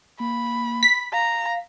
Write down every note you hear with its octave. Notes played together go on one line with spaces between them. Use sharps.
A#3 B5
B6
F5 A#5